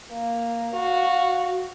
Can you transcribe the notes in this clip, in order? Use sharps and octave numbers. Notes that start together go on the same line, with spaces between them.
A#3
F#4 F5